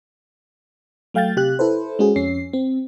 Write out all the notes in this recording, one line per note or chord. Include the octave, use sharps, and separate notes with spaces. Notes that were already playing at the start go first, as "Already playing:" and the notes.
F#3 A3 F5 G5 G6 A6
C3 G4 F#6
E4 A4 B4 C5
G#3 C#4 F#4 G#4
F2 C#4 C7
C4